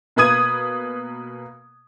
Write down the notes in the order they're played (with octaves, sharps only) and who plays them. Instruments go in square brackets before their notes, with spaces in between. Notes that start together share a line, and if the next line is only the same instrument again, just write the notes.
[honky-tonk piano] B2 A#3 B4 D#6 G#6 D#7